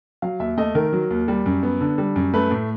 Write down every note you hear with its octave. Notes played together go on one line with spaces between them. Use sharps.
F#3 F5
D#2 E5
A3 D#5
D#3 A#4
F#3
D#2
G3
F#2
B3
D3
G3
F#2
A3 B4
A2